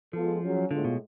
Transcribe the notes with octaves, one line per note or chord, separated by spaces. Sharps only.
F3 G#3 B3 F4 A4
F#3 C#4 G#4
A2 D3 G#3 B3 F4
B2